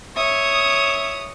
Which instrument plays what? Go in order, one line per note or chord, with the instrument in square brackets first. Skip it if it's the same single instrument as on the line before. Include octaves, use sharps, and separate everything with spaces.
[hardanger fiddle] C#5 [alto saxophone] E5 [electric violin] D#6